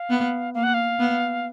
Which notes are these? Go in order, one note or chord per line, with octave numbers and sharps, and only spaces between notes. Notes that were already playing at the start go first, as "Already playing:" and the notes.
Already playing: F5
B3
A#3 F5
F#5
F5
B3